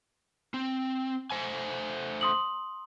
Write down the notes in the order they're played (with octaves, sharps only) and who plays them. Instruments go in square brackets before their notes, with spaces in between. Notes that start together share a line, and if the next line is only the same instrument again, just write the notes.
[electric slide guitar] C4
A3 C5 G#5
[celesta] C6 D#6 F#7